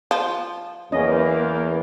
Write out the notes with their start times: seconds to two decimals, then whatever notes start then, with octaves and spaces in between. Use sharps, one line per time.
0.11 F3
0.92 E2 A#3 C#4 D#5